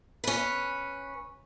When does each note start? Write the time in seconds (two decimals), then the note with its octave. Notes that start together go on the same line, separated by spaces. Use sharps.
0.24 C#4 B4